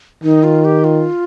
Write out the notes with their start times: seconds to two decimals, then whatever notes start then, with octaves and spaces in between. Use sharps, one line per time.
0.24 D#3 D#4
0.43 F4
0.65 G4
0.84 F4